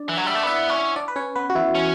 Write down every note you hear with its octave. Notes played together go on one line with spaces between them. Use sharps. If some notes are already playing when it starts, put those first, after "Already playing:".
Already playing: D4 D5
E3
F#3 F#5
G3 E5
A3 D5
B3 E4 E5
C#4
D4 D5
B4
C#4 C#5
B3 B4
F#4
E3 E4
C#4